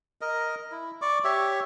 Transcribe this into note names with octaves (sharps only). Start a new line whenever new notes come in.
A#4 D#5
E4
D5 C#6 D6
G4 C#5 E5